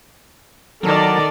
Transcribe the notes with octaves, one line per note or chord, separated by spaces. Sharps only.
D#3 F#3 A4 A#4 D5 A5